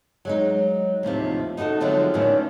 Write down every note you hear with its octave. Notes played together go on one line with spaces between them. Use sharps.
F#3 G#3 D#4
D#2 A2 C3 F3
D#4 E4 F#4 A4 D#5
D3 F3 F#3 G#3 A3 C4
A2 D3 D#3 B3 C#4 D4